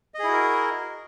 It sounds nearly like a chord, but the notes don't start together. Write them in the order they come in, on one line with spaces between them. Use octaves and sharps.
D#5 G#4 E4 F#4 A#4